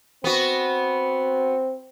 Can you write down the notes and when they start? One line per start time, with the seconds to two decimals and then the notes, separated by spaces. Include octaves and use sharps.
0.24 B3 C4 F#4